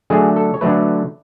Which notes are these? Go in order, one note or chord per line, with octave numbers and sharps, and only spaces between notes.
D3 F#3 A3 G#4
A4
C#5
D3 F#3 A3 B4